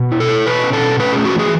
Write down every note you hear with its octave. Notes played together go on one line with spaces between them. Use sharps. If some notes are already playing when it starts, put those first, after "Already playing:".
Already playing: B2
E4
A4
E4
B2 B4
C#4
A4
B2
C#4 B4
A3 G#4
F#4
E3 G#4